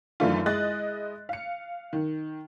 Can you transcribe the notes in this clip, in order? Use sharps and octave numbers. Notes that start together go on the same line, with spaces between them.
F#2 D#3 E3 A3 D4 F4
G#3 E4 D#5 F#6 A6
F5 C#7
D#3